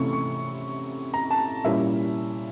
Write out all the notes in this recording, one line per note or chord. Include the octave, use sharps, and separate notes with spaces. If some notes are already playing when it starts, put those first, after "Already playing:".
Already playing: C3 E3 A3 C#4 E4 C#6
C#6
A#5
A5
A#2 G3 A#3 C#4 E4 E5